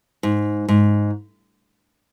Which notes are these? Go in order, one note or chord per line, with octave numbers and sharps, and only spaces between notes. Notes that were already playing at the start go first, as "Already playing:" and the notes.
G#2
G#2